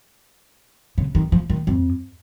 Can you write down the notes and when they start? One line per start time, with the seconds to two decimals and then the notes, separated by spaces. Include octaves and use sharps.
0.98 C#3
1.15 D#3
1.32 F3
1.50 D#3
1.67 F2